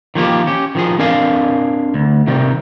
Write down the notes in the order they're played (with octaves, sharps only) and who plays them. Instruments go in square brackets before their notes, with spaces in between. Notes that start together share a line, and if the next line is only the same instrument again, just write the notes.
[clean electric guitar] D#3 F3 A#3 G4
C#4 G4
D#3 F3 G#4
C4 D4 A#4 D5 F5 G#5
D2
C3 D#3 G3